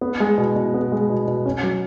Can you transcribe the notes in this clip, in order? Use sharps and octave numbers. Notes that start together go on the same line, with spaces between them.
B3
G#3
B2
B2
B3
G#3
B2
B2
C#4
F#3